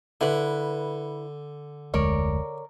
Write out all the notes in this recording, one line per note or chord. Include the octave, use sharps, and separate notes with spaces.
D3 E4 B4
F1 D2 G#3 A#4 C#5 D5